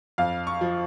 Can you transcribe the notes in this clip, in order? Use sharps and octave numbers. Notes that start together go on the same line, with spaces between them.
F2 F5
C#6
F3